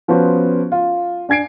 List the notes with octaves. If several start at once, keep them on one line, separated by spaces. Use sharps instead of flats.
F3 B3 C#4 F#4 C5
F4
D4 G#5 G#6 C7 D7